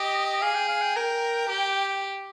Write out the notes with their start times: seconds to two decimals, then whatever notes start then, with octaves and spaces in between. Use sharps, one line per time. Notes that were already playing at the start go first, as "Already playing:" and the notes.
Already playing: G4 D#5
0.42 G#4 F5
0.55 G5
0.68 F5
0.82 G5
0.96 A#4 G5
1.49 G4